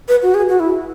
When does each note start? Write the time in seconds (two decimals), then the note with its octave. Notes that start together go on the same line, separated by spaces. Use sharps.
0.08 B4
0.22 F#4
0.34 G#4
0.49 F#4
0.60 E4